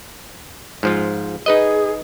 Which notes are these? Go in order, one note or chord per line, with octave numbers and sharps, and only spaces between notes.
G#2 F3 F4
D#4 G#4 B4 D#5